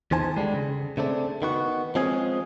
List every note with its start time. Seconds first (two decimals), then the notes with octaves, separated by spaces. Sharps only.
0.11 E2 D#3 C5 G#5 A5
0.37 D3 G3 G#3
0.54 C#3
0.97 C#3 A3 C4 D4
1.42 D#3 B3 F#4
1.95 F3 G#3 C4 C#4 G#4